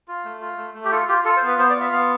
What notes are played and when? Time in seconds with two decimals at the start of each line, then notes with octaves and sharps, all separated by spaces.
0.08 F4
0.24 A3
0.41 F4
0.58 A3
0.74 A3
0.85 G4
0.92 F4 A4
1.08 F4 G4
1.25 F4 A4
1.37 C5
1.43 B3
1.48 B4
1.58 B3 C5
1.70 D5
1.75 F4
1.80 E5
1.92 B3 F5